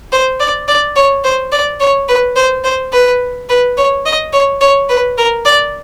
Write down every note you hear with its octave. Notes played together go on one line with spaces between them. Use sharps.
C5
D5
D5
C#5
C5
D5
C#5
B4
C5
C5
B4
B4
C#5
D#5
C#5
C#5
B4
A#4
D5